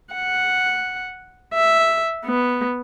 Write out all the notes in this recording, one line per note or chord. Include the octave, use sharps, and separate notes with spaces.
F#5
E5
B3